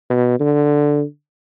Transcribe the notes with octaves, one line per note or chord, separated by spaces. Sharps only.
B2
D3